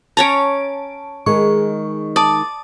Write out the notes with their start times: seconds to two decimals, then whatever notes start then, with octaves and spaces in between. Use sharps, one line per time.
0.17 C#4 C#5 A5 A#5 D7
1.26 D#3 G#3 G#4 C#6
2.16 D5 A5 D#6